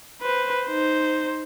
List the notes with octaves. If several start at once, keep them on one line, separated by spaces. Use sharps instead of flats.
B4 C5
D#4 C5